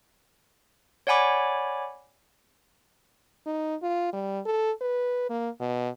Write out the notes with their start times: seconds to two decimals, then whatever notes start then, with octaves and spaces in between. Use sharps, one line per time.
1.07 C#5 D5 F#5 G#5 B5 D6
3.46 D#4
3.82 F4
4.13 G3
4.46 A4
4.81 B4
5.30 A#3
5.60 B2